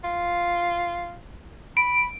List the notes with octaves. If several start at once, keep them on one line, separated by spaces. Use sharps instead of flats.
F4
B5 D7